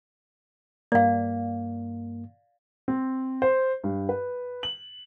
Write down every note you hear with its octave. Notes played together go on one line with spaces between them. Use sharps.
G2 A#3 D5 F5
C4
C5
G2
B4
F#7